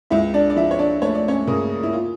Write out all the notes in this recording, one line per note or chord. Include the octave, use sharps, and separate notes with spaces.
C#2 E4 E5
D4 D5
D5
F3 E4 E5
C#5
D4 D5
A3 C#5
D5
C#4 C#5
C#3 A#3 A#4
E4
F4